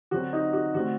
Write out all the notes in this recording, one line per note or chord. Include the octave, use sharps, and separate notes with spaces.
D3 F#3 C4 F#4
D#4
F#4
D3 A3 C4 F#4